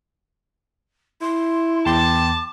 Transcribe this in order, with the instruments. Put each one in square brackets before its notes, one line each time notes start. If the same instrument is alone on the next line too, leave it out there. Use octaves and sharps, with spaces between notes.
[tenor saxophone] E4 [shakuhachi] C6
[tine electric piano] E2 G5 C6 [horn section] A5 [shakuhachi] D6